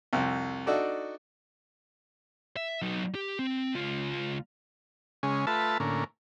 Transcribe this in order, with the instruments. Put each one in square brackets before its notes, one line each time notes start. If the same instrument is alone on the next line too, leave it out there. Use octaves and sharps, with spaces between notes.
[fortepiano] C2 F2
D4 D#4 F#4 A4 D5
[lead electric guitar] E5
F#3 D#4
G4
C4
C#2 F4
[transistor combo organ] C#3 G#3 C#4
A3 F4 B4 E5 A5
A2 D3 A#3 C#4